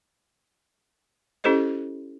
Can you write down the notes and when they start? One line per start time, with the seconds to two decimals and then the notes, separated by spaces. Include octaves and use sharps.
1.44 C#4 E4 G4 A4 C5 D#5